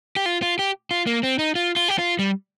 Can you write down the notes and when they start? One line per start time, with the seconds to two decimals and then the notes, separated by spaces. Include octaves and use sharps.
0.16 G4
0.26 F4
0.42 F4
0.59 G4
0.91 F4
1.07 A#3
1.23 C4
1.39 D#4
1.55 F4
1.76 F4
1.88 G4
1.99 F4
2.19 G3